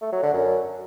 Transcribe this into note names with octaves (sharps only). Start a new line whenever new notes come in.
A3
F#3
D3
F#2